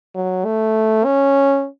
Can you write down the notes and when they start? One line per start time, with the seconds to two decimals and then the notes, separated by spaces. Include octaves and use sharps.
0.15 F#3
0.45 A3
1.05 C#4